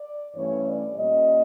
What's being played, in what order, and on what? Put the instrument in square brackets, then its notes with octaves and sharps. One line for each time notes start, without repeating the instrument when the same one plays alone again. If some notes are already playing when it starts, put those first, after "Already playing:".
Already playing: [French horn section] D5
G2 E3 A3 C#4 C#5
D5
A#2 G3 A#3 C#4 D#5